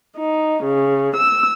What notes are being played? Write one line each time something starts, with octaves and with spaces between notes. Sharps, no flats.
D#4
C#3
E6